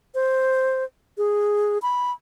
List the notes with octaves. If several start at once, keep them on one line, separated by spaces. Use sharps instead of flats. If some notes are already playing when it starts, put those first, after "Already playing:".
C5
G#4
B5